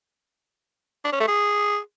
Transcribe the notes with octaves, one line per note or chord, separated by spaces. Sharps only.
D4
C#4
A3
G#4